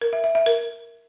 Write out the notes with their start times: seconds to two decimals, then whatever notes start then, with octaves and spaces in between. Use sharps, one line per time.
0.02 A#4
0.13 E5
0.24 E5
0.35 E5
0.46 A#4